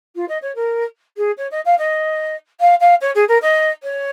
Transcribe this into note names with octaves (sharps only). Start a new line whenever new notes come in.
F4
D#5
C#5
A#4
G#4
C#5
D#5
F5
D#5
F5
F5
C#5
G#4
A#4
D#5
C#5